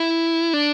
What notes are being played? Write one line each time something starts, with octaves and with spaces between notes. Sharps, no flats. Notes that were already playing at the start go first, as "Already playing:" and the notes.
Already playing: E4
D4